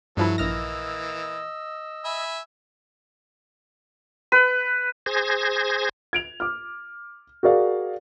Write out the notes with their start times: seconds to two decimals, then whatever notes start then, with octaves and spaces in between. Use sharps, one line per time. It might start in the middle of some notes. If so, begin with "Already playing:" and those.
0.17 G2 F3 F#3 E4 A4
0.38 A#1 E3 A#3 D#5 E6 F6 A#6
2.05 E5 G#5 B5
4.32 B4
5.06 G#4 C5 G#6 A#6
6.13 G#6 D7 F7
6.40 D6 F6
7.43 F#4 G#4 A#4 D5 F5